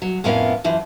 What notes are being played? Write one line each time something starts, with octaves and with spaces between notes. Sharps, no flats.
F#3
F2 A2 B3 C#4 A#4 F5
F#2 E3 F3